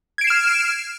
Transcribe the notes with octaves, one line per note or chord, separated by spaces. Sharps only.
F6 G#6 C7 D7 E7